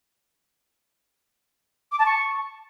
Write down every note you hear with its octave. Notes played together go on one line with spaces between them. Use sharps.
D6
A5
C#6